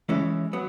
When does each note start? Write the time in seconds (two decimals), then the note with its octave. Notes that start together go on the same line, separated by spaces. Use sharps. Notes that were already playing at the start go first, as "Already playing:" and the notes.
0.09 E3 G#3 C#4 E4
0.53 F#3 B3